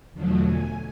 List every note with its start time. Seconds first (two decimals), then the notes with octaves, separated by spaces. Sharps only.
0.13 E2 B2 D3 F3 F#3 A3
0.44 G#5